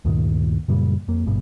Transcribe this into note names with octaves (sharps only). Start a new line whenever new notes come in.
D2 G2 A#2 D#3
F#2 A#2 C#3 G3
F2 A#3
G#1 G2 B2